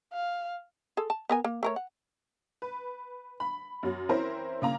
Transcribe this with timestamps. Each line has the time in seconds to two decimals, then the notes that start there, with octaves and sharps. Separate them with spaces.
0.13 F5
0.97 G#4 A4
1.10 A5
1.29 B3 A#4 G#5
1.44 A#3
1.63 A3 A#4 C#5
1.76 F#5
2.62 B4
3.40 B5
3.83 F#2 F#3
4.09 E3 C4 C#4 E4 A#4 C5
4.62 C#3 A#3 A#5